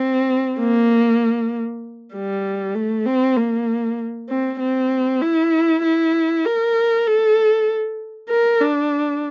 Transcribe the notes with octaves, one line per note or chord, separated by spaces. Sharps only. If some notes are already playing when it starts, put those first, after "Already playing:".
Already playing: C4
A#3
G3
A3
C4
A#3
C4
C4
E4
E4
A#4
A4
A#4
D4